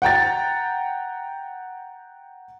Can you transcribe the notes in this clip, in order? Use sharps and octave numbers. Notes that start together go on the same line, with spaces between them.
F#5 G5 A#5 A6